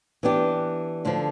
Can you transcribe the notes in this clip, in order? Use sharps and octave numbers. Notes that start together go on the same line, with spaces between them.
E3 B3 D4 G4
D2 D3 F3